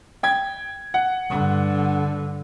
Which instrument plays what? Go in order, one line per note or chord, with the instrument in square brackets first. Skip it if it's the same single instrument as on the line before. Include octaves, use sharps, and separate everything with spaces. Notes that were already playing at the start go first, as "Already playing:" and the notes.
[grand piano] G5 G#6
F#5
[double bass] G2 D3